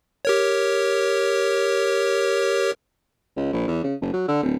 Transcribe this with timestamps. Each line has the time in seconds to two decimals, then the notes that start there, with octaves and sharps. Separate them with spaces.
0.25 G4 A#4 C#5
3.37 C#2
3.53 A#1
3.68 E2
3.84 C#3
4.02 F#1
4.14 F#3
4.28 D3
4.43 D1